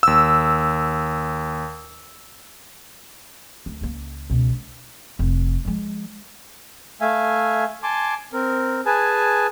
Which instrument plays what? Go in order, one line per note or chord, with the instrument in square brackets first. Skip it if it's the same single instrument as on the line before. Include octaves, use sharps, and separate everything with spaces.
[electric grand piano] D#2 E6
[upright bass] D2
C#2 A#3
C#2 B2
D4
F1
F3 G#3
[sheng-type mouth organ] A3 E5 F5 G#5
G#5 A5 C6 D6
C4 A#4
G#4 B4 G#5 A5